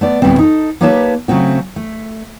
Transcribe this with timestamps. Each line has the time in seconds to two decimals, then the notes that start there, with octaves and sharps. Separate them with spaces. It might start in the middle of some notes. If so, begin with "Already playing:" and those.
0.01 A3 B3 D5
0.22 D2 A2 C#3 G3 B3 C4
0.39 D#4 A4
0.81 A#3 D#4 G4 B4 C#5 A5
1.28 C#3 F#3 A3 C4 F#4
1.76 A3